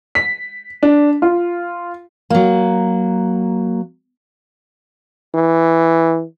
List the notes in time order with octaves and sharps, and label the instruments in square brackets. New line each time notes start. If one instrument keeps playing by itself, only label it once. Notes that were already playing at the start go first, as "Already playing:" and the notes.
[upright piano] B6
D4
F4
[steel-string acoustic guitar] F#3 A#3
[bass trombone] E3